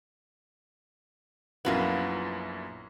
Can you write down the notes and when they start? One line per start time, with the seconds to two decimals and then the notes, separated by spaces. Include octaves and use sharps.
1.65 A#1 F#2 B3 E4 F4 A#4